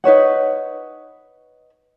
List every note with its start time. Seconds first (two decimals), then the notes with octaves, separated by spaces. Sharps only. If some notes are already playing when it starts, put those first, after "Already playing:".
0.04 D#4 B4 C#5 F#5